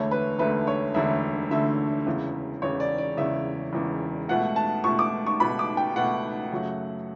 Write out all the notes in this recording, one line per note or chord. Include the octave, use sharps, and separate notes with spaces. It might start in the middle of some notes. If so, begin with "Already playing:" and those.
Already playing: E1 D2 D3 A3 C#5
B4
E1 D2 D3 A3 B4
C#5
E1 D2 D3 A3 E5
E1 D2 D3 A3 E5
E1 E2 C#3
E1 E2 C#3 C#5
D5
D5
E1 E2 C#3 E5
E1 E2 C#3
C#2 B2 A3 F#5
A5
C#2 B2 A3 C#6
D6
C#6
C#2 B2 A3 B5
D6
G5
C#2 B2 A3 F#5
F#2 C#3 F#3 A3